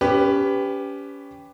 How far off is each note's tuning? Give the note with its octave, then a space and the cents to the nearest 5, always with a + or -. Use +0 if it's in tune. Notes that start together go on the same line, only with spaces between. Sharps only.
C#4 +30 G4 +5 B4 +15